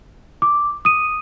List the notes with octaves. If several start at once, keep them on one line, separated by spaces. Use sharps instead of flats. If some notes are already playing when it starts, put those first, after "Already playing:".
D6
D#6 D#7